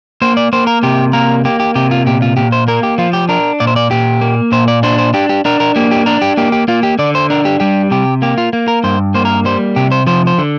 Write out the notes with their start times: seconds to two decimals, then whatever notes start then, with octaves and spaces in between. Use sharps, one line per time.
0.22 A#3 C5
0.37 D5
0.53 A#3 C5
0.67 A#4
0.83 C3 G4
1.13 A#3 A#4
1.45 A#3 G4
1.60 G4
1.75 C3 G4
1.91 F4
2.06 A#2 G4
2.22 F4
2.37 A#2 G4
2.52 C5
2.68 A#3 A#4
2.83 G4
2.98 F3 F4
3.13 G4
3.29 D4 A#4
3.60 A#2 D5
3.67 C5
3.76 D5
3.91 A#2 G4
4.21 A#3
4.52 A#2 C5
4.68 D5
4.83 D4 C5
4.99 C5
5.14 D4 G4
5.29 G4
5.45 D4 A#4
5.60 A#4
5.76 A#3 G4
5.91 G4
6.06 D4 A#4
6.21 G4
6.37 A#3 G4
6.52 G4
6.68 A#3 F4
6.83 G4
6.99 D3 D5
7.15 C5
7.30 D4 A#4
7.45 G4
7.60 G3 G4
7.91 C3 G4
8.22 A#3 G4
8.38 F4
8.53 A#3
8.68 A#4
8.84 G2 C5
9.15 A#3 C5
9.25 A#4
9.45 G3 C5
9.76 C3 G4
9.92 C5
10.07 F3 C5
10.27 C5
10.38 D3